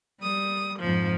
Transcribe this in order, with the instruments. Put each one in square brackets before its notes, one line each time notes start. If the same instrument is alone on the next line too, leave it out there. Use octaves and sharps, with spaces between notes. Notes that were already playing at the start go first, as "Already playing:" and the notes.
[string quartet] G3 D#6
F2 G#2 F3